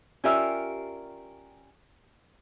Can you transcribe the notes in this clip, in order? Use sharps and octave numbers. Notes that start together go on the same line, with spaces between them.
C#4 F4 G4 A#4 D5 E5